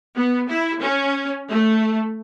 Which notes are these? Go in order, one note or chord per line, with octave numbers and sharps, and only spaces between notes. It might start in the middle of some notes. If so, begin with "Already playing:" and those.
B3
E4
C#4
A3